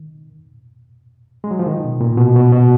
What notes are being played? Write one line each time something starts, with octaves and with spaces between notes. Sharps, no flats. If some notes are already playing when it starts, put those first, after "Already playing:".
Already playing: D#3
G#3
F#3
F3
D#3
B2
A#2
B2
B2
B2